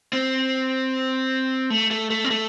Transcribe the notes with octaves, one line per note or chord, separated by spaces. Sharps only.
C4
A3
A3
A3
C4
A3